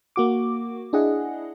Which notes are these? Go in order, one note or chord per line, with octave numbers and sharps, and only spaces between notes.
A#3 F#4 D6
D4 E4 G#4 D#5 F#5